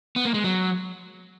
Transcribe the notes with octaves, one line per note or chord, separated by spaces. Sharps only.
B3
A#3
G#3
F#3